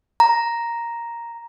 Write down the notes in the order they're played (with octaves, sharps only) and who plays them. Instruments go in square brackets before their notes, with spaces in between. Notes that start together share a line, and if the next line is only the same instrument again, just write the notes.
[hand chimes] A#5